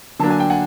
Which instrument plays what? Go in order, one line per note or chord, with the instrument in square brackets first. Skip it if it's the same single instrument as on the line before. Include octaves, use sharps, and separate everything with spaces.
[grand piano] D3 F#3 A#3 D4 A5
G#5
G5
F#5 G#5